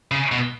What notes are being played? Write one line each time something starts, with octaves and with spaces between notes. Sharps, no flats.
C#3
B2